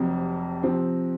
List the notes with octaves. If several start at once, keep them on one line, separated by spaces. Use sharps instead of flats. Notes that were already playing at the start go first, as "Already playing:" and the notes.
Already playing: F1 F2 C3 F#3 C4
C3 F3 C4